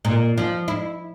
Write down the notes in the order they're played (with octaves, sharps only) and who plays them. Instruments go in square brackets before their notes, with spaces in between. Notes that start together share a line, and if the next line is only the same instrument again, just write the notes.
[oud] A#2
F3
E4